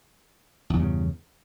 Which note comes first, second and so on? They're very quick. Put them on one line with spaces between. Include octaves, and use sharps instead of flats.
E2 G2 C#3